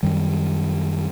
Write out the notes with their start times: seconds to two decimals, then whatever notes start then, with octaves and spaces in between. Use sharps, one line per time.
0.03 F#2 D#3 G3